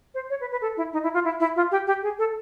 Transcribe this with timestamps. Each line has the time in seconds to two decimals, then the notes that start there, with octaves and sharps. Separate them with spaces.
0.14 C5
0.30 C#5
0.41 B4
0.51 B4
0.61 A4
0.77 E4
0.93 D#4
1.03 E4
1.14 F4
1.24 E4
1.40 E4
1.56 F4
1.71 G4
1.87 G4
2.02 G#4
2.19 A4